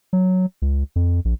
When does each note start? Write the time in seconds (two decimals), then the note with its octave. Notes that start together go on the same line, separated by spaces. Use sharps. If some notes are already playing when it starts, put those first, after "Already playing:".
0.13 F#3
0.62 C#2
0.96 F2
1.25 A#1